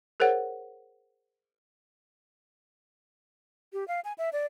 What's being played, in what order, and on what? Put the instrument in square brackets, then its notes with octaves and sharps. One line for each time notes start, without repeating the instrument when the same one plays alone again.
[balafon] G#4 A#4 C5 C#5 F#5
[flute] G4
F5
G#5
E5
D5